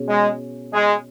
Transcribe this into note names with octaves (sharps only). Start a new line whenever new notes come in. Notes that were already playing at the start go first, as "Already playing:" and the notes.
Already playing: B2 C#4 G#4
G#3
G#3